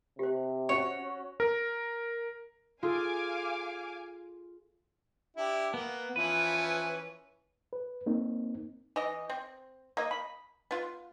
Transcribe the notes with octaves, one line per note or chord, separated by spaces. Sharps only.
C3 G4 C5
C#4 F#4 C#5
A#4
F4 G#4 A4 F5 G#5 D6
D4 E4 G4
A#3 B3
E3 F3 C#4 B4
B4
A#3 C4 D#4
E3 D#5
C4
A#3 D#5
B5
B3 F4